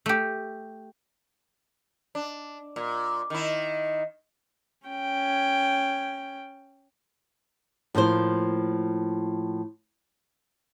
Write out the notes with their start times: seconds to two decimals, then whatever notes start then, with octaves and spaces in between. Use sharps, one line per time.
0.06 A3 G4
2.15 D4
2.76 A#2
3.30 D#3 E4
4.87 C#4 G5
7.95 A2 F3 A#3 C5